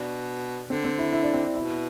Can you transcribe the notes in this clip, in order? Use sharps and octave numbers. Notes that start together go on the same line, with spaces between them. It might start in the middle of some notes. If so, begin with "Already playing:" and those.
Already playing: B2 D4
D3 C4
C4
E4
E4
D4
C4
D4
B2 E4